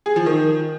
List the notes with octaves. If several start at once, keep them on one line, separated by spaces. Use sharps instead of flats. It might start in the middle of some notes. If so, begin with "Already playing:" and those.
G#4
F3
D#3